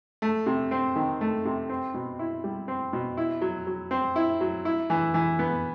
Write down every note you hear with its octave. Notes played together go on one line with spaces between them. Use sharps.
A3
C3
C4
D#3
A3
C3
C4
B2
E4
G3
C4
B2
E4
F#3
F#3
C4
E4
F#3
E4
E3
E3
B3